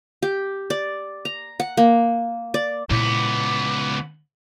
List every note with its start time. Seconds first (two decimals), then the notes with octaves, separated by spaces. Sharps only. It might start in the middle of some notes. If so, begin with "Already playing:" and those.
0.22 G4
0.70 D5
1.25 A#5
1.60 F#5
1.77 A#3
2.54 D5
2.90 C#2 A#2 B3 E4 D6